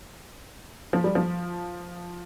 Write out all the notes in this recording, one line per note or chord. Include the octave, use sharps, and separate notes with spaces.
F3
G3
F3